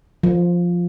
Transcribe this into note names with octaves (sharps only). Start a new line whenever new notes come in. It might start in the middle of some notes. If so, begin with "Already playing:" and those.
F3